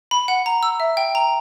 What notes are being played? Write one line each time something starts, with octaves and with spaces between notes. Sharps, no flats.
B5
F#5
A#5
E6
E5
G5
A#5